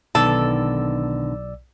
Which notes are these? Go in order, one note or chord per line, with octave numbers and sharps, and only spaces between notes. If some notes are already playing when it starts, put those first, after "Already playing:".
B1 B2 D3 D#3 A4 D5 E6